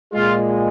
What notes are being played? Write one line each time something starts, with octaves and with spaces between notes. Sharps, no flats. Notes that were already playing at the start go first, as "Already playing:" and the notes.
A#2 G#3 F4